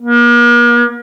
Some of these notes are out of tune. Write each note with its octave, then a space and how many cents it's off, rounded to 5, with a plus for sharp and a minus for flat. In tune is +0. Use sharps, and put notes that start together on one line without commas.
A#3 +45